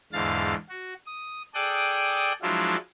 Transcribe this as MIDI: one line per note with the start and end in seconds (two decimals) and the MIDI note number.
0.13 0.54 40
0.13 0.54 44
0.13 0.54 50
0.13 0.54 77
0.13 0.54 93
0.69 0.94 66
1.06 1.42 87
1.54 2.32 68
1.54 2.32 69
1.54 2.32 74
1.54 2.32 79
1.54 2.32 87
1.54 2.32 90
2.42 2.76 53
2.42 2.76 54
2.42 2.76 56
2.42 2.76 62
2.42 2.76 64
2.42 2.76 65